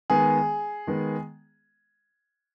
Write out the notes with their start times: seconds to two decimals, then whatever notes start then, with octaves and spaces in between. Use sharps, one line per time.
0.10 D#3 G#3 B3 G#4
0.87 D#3 G#3 B3